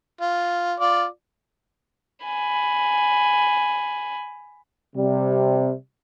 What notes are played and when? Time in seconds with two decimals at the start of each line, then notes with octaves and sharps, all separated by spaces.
0.21 F4
0.80 F4 D5
2.24 G#5 B5
4.96 C3 G3